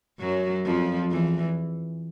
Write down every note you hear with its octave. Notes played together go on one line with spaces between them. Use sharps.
F#2 F#3
F2 F3
E2 E3